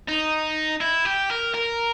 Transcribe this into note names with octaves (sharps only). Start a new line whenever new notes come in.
D#4
E4
G4
A#4
A#4